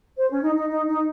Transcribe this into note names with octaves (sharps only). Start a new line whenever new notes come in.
C5
C#4
D#4
D#4
D#4
D#4